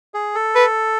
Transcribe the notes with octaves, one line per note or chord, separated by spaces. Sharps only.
G#4
A4
B4